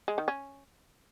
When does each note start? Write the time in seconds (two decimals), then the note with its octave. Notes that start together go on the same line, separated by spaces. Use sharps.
0.08 G#3
0.18 D#3
0.28 C#4